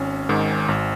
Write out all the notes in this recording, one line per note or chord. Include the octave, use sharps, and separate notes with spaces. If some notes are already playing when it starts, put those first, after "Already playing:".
Already playing: G#1 C#4
G#2 D#3
G#1